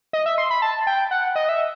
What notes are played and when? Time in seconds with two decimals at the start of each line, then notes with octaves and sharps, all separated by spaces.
0.13 D#5
0.26 E5
0.38 C6
0.50 B5
0.62 A5
0.87 G5
1.11 F#5
1.36 D#5
1.49 E5